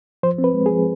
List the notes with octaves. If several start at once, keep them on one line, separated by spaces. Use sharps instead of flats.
F3 C5
C4
B4
G#3
G#4
F3